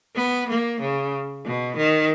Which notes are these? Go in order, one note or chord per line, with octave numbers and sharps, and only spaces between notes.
B3
A#3
C#3
B2
D#3